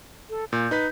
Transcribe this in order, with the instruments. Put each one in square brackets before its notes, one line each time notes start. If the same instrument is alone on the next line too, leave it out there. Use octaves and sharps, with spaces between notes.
[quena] A4
[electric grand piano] A#2 [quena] G6
[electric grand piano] D#4 B4 B6